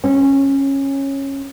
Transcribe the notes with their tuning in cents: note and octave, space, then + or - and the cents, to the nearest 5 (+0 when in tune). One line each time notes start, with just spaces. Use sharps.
C#4 -15